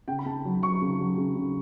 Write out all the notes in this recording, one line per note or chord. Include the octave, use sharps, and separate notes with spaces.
C#3 G5
B5
C#3 A5
F#3
F#3 C#6
C#3
F#3
C#3
C#3